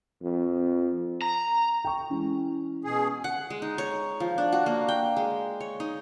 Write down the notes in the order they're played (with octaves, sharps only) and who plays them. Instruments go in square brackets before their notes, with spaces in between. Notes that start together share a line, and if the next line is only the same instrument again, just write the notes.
[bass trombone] F2
[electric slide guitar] A#5
[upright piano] G5 C#6
[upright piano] E3 G#3 [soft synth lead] C#4
[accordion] B2 G#4
[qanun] F#5
G#3
D#4
C#5
F3
D4
F#4
A#3
G5
G#3
C#5
D#4